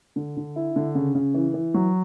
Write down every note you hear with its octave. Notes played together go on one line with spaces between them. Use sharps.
D3
D3
E4
D3
C#3
C#3
E3
E3
F#3